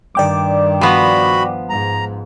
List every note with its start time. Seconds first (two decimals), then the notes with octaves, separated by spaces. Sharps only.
0.15 G2 D#3 D5 G5 D6
0.81 F3 B3 F#4 B5
1.70 G#2 A#5